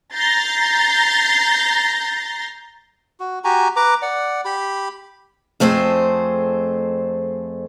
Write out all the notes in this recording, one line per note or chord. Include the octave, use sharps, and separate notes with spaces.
A#5 G6 A6 A#6 C7
F#4
F#4 G4 G#5 A#5
B4 A#5 D6
D5 F#5
G4 B5
F2 A3 C4 G#4 C5